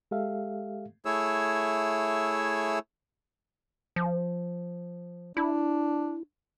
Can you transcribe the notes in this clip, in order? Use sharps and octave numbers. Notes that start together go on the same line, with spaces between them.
G#3 G4 A4 E5 F5
A3 E4 G#4 C#5 E6
F3
D4 E4